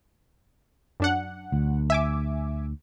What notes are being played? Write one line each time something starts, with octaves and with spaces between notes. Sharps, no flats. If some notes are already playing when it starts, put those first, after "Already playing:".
F#2 D4 F#5
D2
E5 G#5 D6